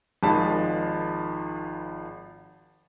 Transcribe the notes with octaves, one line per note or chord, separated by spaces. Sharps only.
G#1 D#3 F3 G#3 A5 B5